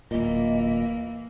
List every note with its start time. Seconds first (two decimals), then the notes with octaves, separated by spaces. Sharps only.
0.11 D1 A#2 E3 A#3 D#5